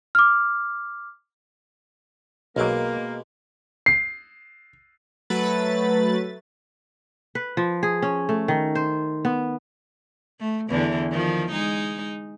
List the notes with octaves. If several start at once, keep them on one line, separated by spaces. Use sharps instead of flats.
D6 F6
B1 B2 F#3 G#3 A#3 D6
C7
F#3 A3 B4 A6
B4
F3
G#4
C#4
A3
D#3
C5
B3
A3
E2 D3 E3
D#3 F3
G#3 D#4